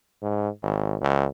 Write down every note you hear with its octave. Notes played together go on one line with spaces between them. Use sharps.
G#2
G#1
C#2